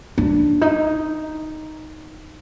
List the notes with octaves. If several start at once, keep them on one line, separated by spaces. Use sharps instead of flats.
D4
D#4